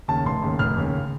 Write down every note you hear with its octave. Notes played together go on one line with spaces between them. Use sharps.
D#2 C#3 A5
F1 C6
D#2 C#3
F1 F6
D#2 C#3